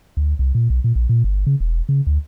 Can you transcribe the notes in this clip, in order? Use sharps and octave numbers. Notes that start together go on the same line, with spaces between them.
D2
C2
A#2
B1
A#2
A#1
A#2
G1
C#3
E1
C#3
D2